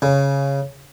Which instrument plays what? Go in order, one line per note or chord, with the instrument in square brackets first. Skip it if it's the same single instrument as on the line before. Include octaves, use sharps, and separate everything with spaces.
[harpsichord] C#3